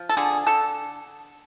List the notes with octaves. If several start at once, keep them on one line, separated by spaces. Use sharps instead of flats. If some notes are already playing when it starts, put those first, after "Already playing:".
Already playing: F3
A4
D3 G#4
D3 A4